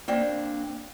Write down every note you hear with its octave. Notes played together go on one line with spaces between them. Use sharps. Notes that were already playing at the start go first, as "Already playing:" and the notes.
A#3 C4 D4